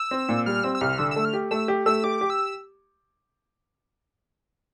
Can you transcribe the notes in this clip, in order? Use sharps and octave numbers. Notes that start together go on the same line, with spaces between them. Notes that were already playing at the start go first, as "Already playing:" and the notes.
Already playing: E6
C4
A#2
G3 F6
C4 E6
E6
C2 F6
D3 E6
E6
A3
F6
G4
A3 E6
G4
A3 E6
G4 D6
G4
E6